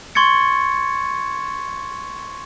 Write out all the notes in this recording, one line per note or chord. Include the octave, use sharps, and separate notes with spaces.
C6 C#6 G#6 A6 C#7